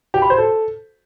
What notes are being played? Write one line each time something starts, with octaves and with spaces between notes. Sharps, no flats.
G4
B5
C5
A4